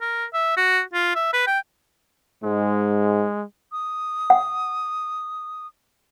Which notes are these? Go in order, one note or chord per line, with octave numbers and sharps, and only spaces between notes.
A#4
E5
F#4
F4
E5
B4
G5
G#2 G#3
D#6
F#5